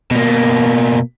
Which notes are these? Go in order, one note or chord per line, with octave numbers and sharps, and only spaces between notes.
B2 A#3